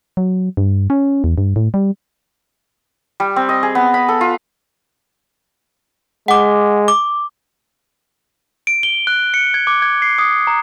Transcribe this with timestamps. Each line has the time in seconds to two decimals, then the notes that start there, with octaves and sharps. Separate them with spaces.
0.17 F#3
0.57 G2
0.90 C#4
1.24 E2
1.38 G2
1.56 A2
1.74 G3
3.20 G3
3.36 C4
3.49 D#5
3.63 G#4
3.75 B3
3.94 B5
4.09 A4
4.21 F4
6.28 G#3 F#5 D6
6.88 D6
8.67 D7
8.83 G7
9.07 F#6
9.34 C#7
9.54 G#6
9.67 D6
9.82 G#6
10.02 C7
10.18 D#6
10.47 A#5